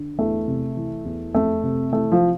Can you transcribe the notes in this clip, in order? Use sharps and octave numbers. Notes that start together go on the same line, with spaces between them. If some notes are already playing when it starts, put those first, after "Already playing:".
Already playing: D3
E2 A3
C3
E3
E2
F2 A3
C3
E3 A3
F3